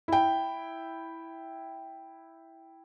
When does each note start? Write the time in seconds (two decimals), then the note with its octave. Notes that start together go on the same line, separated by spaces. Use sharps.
0.08 E4 G5